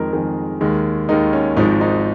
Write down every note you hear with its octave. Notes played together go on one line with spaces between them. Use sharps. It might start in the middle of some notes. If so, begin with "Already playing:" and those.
Already playing: F2 D#3 G#3 A#4
F2 D#3 G#3 G#4
D#2 D#3 G#3
D#2 D#3 G#3 D#4
C#4
G#1 G#2 F3 G#3 D#4
D#4